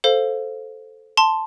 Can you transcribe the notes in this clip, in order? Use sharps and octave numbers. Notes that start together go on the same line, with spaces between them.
A4 C5 F5
A5 C6